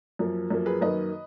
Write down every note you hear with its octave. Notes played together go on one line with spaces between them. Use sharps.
F#2 F3 A#3
F#2 F3 A#3
G#4 B4
F#2 D#3 A#3 B4 D#5